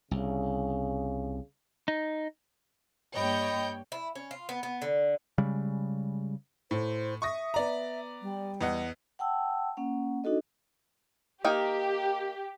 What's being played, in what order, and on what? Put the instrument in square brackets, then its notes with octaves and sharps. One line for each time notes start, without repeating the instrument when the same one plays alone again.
[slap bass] C2 [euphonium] C#3
[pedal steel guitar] D#4
[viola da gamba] G2 A#3 [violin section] C#5 G5 G6 [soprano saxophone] D#5 [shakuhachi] B5
[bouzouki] E4
C#4
F4
B3
B3
D3
[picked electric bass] C#3 G3 G#3
[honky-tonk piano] A2 [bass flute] C5
[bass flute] E5 [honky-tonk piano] C#6 D#6 A#6
[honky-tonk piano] B3 D5 A#5
[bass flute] G3
[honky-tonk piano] E2 D#5 F#5
[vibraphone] F#5 G5 A5 E6
A#3 C#4 F#5
D4 D#4 F#4 A4 D#5
[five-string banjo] A#3 D#4 G5 [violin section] G4